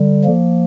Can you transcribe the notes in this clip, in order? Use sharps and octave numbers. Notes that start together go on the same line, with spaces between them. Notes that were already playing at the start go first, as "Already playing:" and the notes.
Already playing: D3 G3
F3 A#3